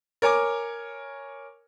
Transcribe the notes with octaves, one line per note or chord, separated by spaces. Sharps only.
A#4 C#5 G#5 D6